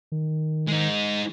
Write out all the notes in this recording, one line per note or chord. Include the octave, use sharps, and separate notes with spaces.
D#3
G#3 D#4